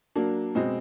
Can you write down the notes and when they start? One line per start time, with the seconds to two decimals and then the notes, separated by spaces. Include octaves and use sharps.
0.15 F#3 A#3 D4
0.55 B2 G#3 C4